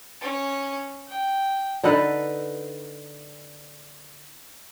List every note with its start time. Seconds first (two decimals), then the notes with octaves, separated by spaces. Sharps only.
0.21 C#4
1.07 G5
1.83 D3 D#4 A4 B4